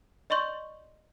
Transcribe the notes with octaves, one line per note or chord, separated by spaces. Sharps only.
D5 D#5 C6 C#6 G6